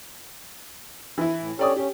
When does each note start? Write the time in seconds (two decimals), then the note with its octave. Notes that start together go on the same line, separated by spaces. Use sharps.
1.18 E3 E4
1.39 A2
1.59 C#4 G4 A4 C#5 D5 D#6
1.76 C#4 G4